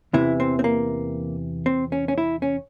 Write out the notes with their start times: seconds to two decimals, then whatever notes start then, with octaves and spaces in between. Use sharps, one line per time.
0.13 E2 C3 E3 E4
0.40 C4
0.59 C4
0.64 A#3
1.66 C4
1.92 C#4
2.08 C#4
2.18 E4
2.42 C#4